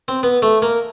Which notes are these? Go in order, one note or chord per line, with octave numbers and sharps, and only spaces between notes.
C4
B3
A3
A#3